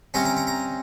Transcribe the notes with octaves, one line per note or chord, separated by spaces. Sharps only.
C3 G3 C#4 A#5
A#5
A#5
A#5